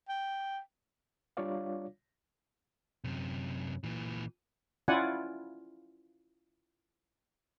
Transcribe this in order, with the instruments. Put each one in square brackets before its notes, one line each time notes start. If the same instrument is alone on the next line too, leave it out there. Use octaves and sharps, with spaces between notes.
[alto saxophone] G5
[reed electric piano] G3 D4 F4 C#5 D5 F5
[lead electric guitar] F#2 C3
A#2 E3
[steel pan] C#4 E4 F4 D5 F#5 G#5